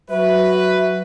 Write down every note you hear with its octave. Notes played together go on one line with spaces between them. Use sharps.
F#3 F#4 B4 E5